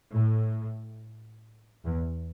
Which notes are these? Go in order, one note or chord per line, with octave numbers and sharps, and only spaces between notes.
A2
E2